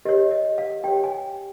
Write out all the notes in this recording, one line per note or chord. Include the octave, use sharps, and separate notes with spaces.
G4 C#5 D#5
D#5
F5
G4 C#5 G5
G#5